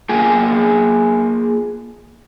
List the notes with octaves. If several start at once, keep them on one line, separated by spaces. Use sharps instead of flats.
A#3 F4 G#4 G5 G#5